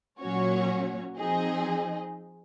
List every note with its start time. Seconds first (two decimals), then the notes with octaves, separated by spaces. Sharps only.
0.20 A#2 F#3 C#4 F#4 C#5
1.17 F3 C4 D#4 G#4 D#5